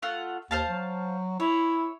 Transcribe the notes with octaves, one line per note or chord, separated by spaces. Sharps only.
A3 F4 F#5
D#2 C5 F5 A5
F#3
E4 C#5